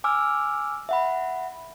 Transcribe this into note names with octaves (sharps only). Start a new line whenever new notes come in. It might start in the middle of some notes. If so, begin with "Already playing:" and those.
G#5 D6 E6 F6
E5 F#5 B5